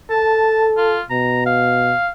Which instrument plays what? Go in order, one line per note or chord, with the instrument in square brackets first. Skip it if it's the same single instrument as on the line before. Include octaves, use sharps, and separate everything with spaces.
[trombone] A4 [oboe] A5
[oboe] F4
[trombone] B2 [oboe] A#5
[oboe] F5